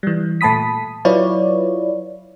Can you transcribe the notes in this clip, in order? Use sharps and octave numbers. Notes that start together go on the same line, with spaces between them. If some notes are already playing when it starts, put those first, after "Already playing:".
E3 G3
A#2 A3 A5 B5 D#6 B6
F#3 E4 F4 B4 C#5 D5